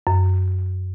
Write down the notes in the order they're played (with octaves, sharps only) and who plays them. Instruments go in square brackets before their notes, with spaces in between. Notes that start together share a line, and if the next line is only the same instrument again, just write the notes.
[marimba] F#2